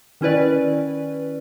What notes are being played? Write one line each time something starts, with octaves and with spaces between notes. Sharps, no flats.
D#3 C#4 E4 B4 D5